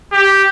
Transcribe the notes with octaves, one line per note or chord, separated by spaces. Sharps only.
G4